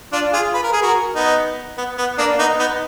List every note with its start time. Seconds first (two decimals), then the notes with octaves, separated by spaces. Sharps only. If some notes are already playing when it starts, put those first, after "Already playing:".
0.12 D4 F4
0.33 F4 G#4
0.54 B4
0.63 A#4
0.72 G#4
0.82 F#4 A#4
1.15 B3 D#4
1.77 B3
1.98 B3
2.18 A#3 D4
2.38 B3 D#4
2.59 B3 D#4